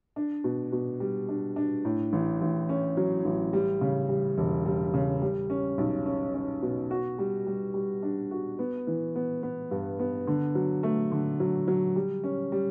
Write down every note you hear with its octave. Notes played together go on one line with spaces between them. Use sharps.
D4
B2
B2
G3
D4
D4
A2
A1
A1
C#4
F#3
A1
G3
C#3
G3
E1
G3
C#3
G3
C#4
B1
C#4
C#4
B2
F#4
G3
G3
G3
D4
F#4
B3
E3
B3
B3
G2
B3
D3
F#3
A3
D3
F#3
F#3
G3
C#4
G3